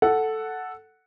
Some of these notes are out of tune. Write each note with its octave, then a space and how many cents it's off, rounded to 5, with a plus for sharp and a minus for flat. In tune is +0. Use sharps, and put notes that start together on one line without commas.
A4 +0 F#5 +0